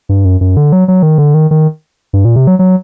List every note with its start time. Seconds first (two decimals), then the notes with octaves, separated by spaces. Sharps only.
0.09 G2
0.25 F#2
0.41 F#2
0.57 D3
0.72 F#3
0.88 F#3
1.03 D#3
1.18 D3
1.34 D#3
1.51 D#3
2.13 G2
2.25 A#2
2.36 C3
2.47 F#3
2.59 F#3